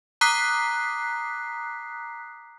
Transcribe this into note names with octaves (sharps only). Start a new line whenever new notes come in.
A#5 D6 D#6 F#6 B6 C7